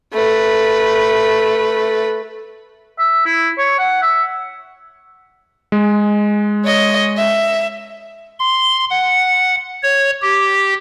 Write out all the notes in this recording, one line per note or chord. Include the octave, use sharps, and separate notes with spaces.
A3 B4
E5
E4
C#5
F#5
E5
G#3
C#5 D#5
E5
C6
F#5
C#5
G4